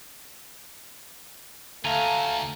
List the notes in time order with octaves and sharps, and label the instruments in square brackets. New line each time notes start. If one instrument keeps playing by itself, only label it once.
[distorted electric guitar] D2 [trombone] A3 [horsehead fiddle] F5 [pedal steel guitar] G#5 A#5